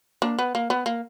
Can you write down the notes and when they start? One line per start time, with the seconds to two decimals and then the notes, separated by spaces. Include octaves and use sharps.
0.22 A#3 D4
0.39 B3
0.55 A#3
0.70 B3
0.86 A#3